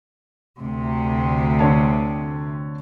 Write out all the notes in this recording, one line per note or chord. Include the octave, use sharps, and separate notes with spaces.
D2 C3
D3 C#5 A5